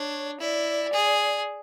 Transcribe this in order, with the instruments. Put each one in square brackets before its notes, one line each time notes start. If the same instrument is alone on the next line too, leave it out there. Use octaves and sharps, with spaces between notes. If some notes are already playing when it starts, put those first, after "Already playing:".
Already playing: [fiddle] D4 [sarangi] C#5
[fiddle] E4 [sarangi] D5
[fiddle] G#4